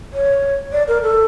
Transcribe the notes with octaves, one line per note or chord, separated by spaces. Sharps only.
C#5
D5
A#4
A4